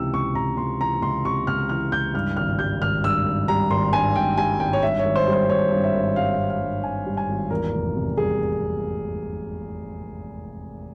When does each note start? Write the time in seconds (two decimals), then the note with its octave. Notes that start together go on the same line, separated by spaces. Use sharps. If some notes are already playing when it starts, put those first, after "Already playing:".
Already playing: C#2 C3 E3 E6
0.13 C#2 C#6
0.35 C3 A#5
0.57 C#2 C6
0.80 E3 A#5
1.02 C#2 C6
1.25 C3 C#6
1.47 C#2 F6
1.69 E3 F6
1.92 C#2 G6
2.14 G2 F6
2.37 G#1 F6
2.59 G3 G6
2.81 G#1 F6
3.04 G2 E6
3.26 G#1
3.48 G3 A#5
3.71 G#1 C6
3.93 G2 G#5
4.15 G#1 G5
4.37 G3 G#5
4.60 G#1 G5
4.73 C#5
4.83 G2 E5
4.99 C#5
5.05 G#1
5.16 C5
5.27 G3
5.33 C5
5.50 G#1 C#5
5.72 G2
5.84 E5
5.95 G#1
6.16 G3 F5
6.39 G#1
6.50 F5
6.61 G2
6.83 G#1 G#5
7.06 G3
7.17 G#5
7.28 G#1
7.50 E2 A#4
7.73 F1
7.95 C3
8.17 G3 G#4